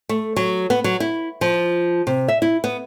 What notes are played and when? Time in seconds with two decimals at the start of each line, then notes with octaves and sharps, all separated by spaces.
0.09 A3
0.36 F#3
0.70 B3
0.84 F#3
1.00 E4
1.41 F3
2.07 C3
2.28 E5
2.42 E4
2.64 B3